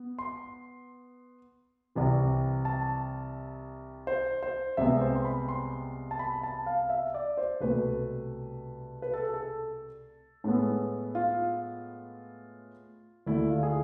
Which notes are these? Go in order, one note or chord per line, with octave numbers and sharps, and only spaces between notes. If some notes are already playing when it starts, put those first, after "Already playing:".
Already playing: B3
C6
C2 C3 E3
A5
C5
C5
C2 C3 G#3 B3 E5
C5
C6
B5
C6
A5
B5
A5
F5
E5
D5
C5
C2 B2 A3 B4
B4
A4
G#4
A4
A2 G#3 B3
F4
D2 D3 A3 E4
F4
G#4